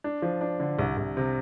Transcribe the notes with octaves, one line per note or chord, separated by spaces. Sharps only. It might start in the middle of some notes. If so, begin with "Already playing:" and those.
D4
F3
D4
D3
C2
C2
C3